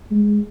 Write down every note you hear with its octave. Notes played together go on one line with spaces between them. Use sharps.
G#3